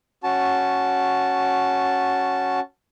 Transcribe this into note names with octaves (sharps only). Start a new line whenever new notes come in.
C#4 F#4 A5